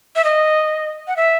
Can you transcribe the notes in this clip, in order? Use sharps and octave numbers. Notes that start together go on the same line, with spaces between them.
E5
D#5
F#5
E5